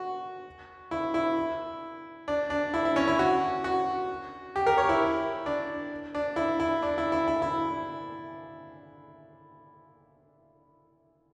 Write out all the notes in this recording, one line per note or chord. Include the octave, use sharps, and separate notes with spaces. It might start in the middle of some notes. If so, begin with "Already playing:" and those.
Already playing: F#4
E4
E4
D4
D4
E4
E4
C#4
E4
F#4
F#4
G4
A#4
C#5
E4
D4
D4
E4
E4
D4
E4
E4
E4
E4